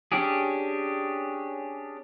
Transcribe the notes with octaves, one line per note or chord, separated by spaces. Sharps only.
C#4 D4 G4 G#4